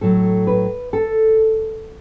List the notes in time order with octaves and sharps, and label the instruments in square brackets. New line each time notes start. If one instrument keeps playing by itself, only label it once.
[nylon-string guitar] A2 F#3 A4
B4
A4